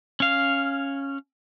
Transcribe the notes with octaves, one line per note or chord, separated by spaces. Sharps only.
C#4 F5